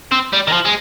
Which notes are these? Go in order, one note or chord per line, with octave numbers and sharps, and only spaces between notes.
C4
G3
D#3
F3
G#3